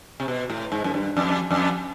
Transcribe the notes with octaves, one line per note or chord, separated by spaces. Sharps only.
C3
B2
A2
G#2
F#2
G2
F2
F2